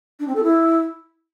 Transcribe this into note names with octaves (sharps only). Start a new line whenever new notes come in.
D4
C4
A4
E4